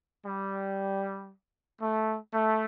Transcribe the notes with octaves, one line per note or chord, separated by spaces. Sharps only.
G3
A3
A3